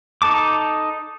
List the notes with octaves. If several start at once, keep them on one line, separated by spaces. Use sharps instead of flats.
D#4 A4 A5 D6